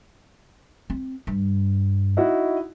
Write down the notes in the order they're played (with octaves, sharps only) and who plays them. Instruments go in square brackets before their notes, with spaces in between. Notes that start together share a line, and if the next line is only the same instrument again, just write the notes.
[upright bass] C4
G2
[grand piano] D#4 E4 F#4